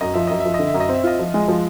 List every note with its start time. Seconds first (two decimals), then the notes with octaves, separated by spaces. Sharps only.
0.01 F#2 D#5
0.14 F3 E5
0.27 F#2 D#5
0.40 E5
0.46 F3
0.54 D#5
0.59 D3
0.67 E5
0.74 F#2
0.80 D#5
0.89 C4
0.94 E5
1.04 F4 D#5
1.19 F3
1.34 G#3
1.48 F3